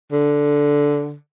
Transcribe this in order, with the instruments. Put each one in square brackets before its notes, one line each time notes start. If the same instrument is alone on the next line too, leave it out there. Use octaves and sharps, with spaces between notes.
[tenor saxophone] D3